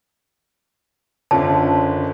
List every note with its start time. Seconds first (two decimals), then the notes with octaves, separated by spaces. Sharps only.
1.31 F#1 D3 C#4 F4 C#5 A5